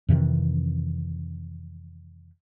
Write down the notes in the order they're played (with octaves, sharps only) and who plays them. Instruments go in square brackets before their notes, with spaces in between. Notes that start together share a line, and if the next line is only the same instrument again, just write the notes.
[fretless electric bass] F2 C3 D#3 E3